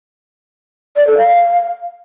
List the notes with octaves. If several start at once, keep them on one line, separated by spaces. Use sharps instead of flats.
D5
A4
F5